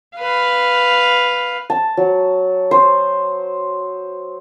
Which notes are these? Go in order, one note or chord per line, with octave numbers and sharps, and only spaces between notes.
B4 F5
A5
F#3
C5